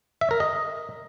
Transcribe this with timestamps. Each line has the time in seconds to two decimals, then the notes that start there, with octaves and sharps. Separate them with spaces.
0.21 E5
0.31 A#4
0.40 D#5